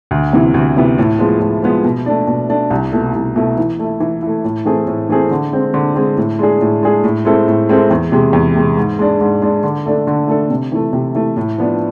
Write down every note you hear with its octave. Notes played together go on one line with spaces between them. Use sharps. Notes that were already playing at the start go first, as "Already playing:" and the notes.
D2
C3 E3 B3
D2
C3 E3 B3
A2
F3 G#3 B3
A2
F3 G#3 B3
B2
A3 D4
B2
A3 D4
C2
B2 A3 E4
C2
B2 A3 E4
E3
A3 E4
E3
A3 E4
A2
E3 A3 C4 G#4
A2
E3 A3 C4 G#4
D3
G#3 C4
D3
G#3 C4
A2
G#3 D4 G#4
A2
G#3 D4 G#4
A2
G#3 C4 E4 A4
A2
G#3 C4 E4 A4
E2
C3 G#3
E2
C3 G#3
G#2
G#3 D4
G#2
G#3 D4
D3
A3 D4 A4
D3
A3 D4 A4
C3
E3 A3
C3
E3 A3
A2
F3 B3 D4